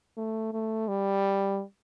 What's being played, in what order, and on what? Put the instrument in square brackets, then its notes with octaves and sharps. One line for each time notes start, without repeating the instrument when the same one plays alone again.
[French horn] A3
A3
G3